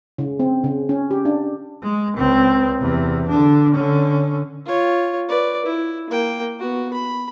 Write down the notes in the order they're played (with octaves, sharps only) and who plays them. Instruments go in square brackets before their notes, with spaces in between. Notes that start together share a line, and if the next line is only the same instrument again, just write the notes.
[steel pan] C#3
C4
C#3
C#4
G4
D4
[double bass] G#3
C#2 C4
E2 C3
D3 D4
D3 C#4
[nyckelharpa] F4 C#5
B4 D5
E4
A#3 G5
B3 F#4
B5